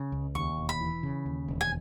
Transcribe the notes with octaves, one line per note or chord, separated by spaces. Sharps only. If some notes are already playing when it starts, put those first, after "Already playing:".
Already playing: C#3
C#2
D#2 C#6
E1
B5
E3
C#3
D#2
E1
G#5